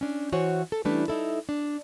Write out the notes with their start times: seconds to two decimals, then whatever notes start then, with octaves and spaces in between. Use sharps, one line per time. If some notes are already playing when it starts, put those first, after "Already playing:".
0.01 C#4 D4
0.32 E3 F#4 C5 C#5 F#5 G#5
0.72 A4
0.85 E3 G3 A3 C#4 D4 B4
1.08 D#4 E4 A4
1.49 D4